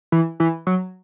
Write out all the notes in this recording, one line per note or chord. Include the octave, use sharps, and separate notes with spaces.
E3
E3
F#3